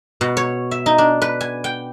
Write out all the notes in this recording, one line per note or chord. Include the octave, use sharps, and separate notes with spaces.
B2
C#5
E5
D#4
D4
B4
G#5
G5